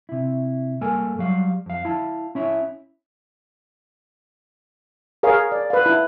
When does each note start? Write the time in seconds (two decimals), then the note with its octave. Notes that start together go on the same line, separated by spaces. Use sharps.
0.09 C3 E4
0.81 G2 A#3 A4 A#4 G#5
1.19 F#3 G3 F5
1.66 F2 F5
1.85 E4 F5 A5
2.35 C#4 E4 C#5 E5
5.23 G#4 A#4 C#5 F5
5.52 D5
5.70 B4 F5
5.86 E4